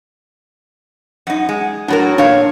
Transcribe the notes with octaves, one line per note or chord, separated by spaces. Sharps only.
F#2 D#4 F#5
G#3
A2 F#3 D4 A#4
A#2 D4 C#5 F5